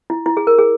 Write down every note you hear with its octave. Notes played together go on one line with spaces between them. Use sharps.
E4
E4
G#4
A#4
G#4